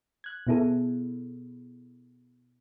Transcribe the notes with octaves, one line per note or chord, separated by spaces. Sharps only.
F#6 G#6
B2 B3 E4 G#4 A4